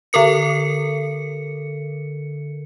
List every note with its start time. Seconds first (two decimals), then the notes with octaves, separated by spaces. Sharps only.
0.13 D3 A4 A#4 C#7